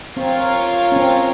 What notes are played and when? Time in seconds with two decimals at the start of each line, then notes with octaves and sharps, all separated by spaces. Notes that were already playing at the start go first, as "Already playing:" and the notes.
0.17 C4 F4 A#4 C#5
0.92 C#4
0.96 C4